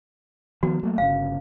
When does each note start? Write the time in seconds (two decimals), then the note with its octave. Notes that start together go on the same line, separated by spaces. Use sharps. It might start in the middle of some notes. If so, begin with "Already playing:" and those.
0.63 D#3 F3 B3 F#4
0.83 F#3 A3 A#3
0.98 G1 C#3 F5